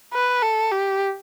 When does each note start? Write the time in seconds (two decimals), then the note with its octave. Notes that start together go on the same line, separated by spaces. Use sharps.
0.13 B4
0.42 A4
0.72 G4